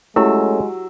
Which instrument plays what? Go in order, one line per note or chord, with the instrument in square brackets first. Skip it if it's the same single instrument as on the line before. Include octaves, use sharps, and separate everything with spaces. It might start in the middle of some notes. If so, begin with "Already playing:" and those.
[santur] F#3 E6 [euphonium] G#3 [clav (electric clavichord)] A3 C#4 [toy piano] E4 G4